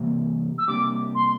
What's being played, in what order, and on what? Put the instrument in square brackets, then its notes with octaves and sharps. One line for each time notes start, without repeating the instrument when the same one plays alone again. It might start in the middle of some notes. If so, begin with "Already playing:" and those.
Already playing: [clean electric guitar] C3 E3 G3 A#3
[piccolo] E6
[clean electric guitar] C3 G3 A#3 D4 G4 [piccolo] D6
[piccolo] C6